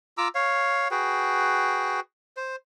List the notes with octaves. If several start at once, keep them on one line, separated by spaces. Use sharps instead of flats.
F4 A#5 D6 E6
C#5 F5
F#4 G#4 B4 G5
C5